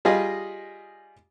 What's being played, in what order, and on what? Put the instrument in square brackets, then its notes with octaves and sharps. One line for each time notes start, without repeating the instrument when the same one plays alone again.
[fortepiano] G3 F4 G#4 D#5